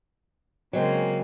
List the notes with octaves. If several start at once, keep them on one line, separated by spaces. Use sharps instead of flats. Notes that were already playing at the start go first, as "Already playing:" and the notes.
C#3 F#3 G#3 A#3 C4